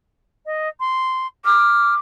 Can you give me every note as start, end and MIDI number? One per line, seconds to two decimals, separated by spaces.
0.46 0.69 75
0.80 1.27 84
1.45 1.99 86
1.45 1.94 89